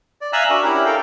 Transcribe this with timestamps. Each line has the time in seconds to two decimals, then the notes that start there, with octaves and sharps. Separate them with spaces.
0.21 D5
0.33 E5 F5 G#5 A#5 E6 F#6
0.50 D4 F#4 A#4
0.63 C#4 E4 G4 A#4
0.86 A4 A#4 F5 G5